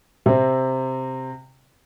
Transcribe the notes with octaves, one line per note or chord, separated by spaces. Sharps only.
C3 C4